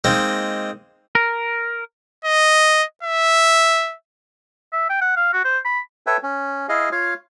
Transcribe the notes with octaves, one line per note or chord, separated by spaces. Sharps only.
G#3 A#3 C4 D#4
A#4
D#5
E5
E5
G5
F#5
F5
F#4
C5
B5
A4 B4 C#5 E5 G5
C#4
E4 G#4 D#5 F5
F4 C#5 F5